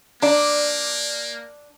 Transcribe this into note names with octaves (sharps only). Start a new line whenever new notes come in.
A#3 D4 D5 A#5